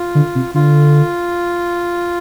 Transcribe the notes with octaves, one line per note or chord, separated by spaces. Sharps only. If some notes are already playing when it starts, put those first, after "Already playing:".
Already playing: F4
D3
C3
D3 F4